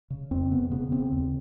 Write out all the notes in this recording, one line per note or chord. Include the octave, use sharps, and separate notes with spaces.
C#3
F2 C4
C#3 B3
C#3 B3
C#3 C4
D#2